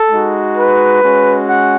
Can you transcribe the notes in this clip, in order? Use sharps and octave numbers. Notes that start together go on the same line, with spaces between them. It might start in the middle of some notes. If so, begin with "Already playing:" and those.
Already playing: A4
G#3 D#4 F#4
B4
G#3 C#4 F#4
F#5